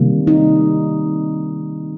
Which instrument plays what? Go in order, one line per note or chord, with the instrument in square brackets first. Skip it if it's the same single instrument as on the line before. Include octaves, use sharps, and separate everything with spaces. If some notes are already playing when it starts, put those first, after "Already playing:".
Already playing: [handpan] C3 D#3 G3 A#3
D#4